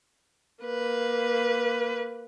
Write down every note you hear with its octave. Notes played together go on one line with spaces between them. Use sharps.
A#3 B4